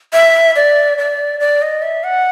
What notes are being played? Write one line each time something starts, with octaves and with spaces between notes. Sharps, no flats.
E5
D5
D5
D5
D#5
E5
F#5